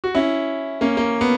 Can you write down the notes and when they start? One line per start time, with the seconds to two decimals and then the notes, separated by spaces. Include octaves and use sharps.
0.04 F#4
0.15 C#4 E4
0.81 A#3 C#4
0.97 A#3
1.21 B3